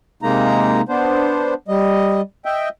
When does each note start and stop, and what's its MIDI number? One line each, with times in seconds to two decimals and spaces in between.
0.23 0.81 48
0.23 0.81 56
0.23 0.81 58
0.23 0.81 63
0.23 0.81 82
0.89 1.54 59
0.89 1.54 62
0.89 1.54 72
1.68 2.21 55
1.68 2.21 75
2.45 2.69 75
2.45 2.69 76
2.45 2.69 79